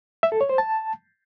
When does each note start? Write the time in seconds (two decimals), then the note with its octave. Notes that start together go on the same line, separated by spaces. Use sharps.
0.23 E5
0.32 A4
0.41 C#5
0.49 C5
0.58 A5